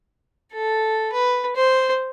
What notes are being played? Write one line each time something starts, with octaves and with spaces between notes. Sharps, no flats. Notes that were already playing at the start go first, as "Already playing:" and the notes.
A4
B4
C5